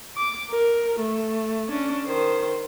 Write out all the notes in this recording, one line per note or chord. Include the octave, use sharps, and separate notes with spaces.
D6
A#4
A3
C#4 D4
D#3 C5